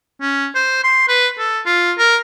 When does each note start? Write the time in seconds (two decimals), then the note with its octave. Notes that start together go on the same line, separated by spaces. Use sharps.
0.21 C#4
0.55 C5
0.84 C6
1.08 B4
1.38 A4
1.66 F4
1.98 A#4